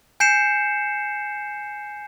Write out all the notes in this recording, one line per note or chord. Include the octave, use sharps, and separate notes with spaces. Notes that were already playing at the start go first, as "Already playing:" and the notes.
G#5 G6 C7 C#7 E7